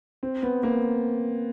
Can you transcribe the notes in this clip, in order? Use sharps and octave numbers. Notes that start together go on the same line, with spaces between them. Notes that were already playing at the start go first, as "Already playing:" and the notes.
C4
B3
A#3